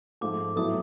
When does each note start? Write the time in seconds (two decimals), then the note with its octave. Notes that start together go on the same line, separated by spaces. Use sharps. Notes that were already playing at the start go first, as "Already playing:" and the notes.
0.21 G#2 F3 A3 D6
0.56 A2 F#3 B3 E4 A4 D#6